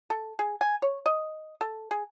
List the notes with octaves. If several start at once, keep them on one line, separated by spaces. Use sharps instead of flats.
A4
G#4
G#5
C#5
D#5
A4
G#4